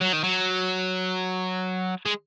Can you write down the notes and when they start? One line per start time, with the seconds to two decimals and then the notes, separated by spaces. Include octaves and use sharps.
0.01 F#3
0.13 D#3
0.24 F#3
2.06 G#3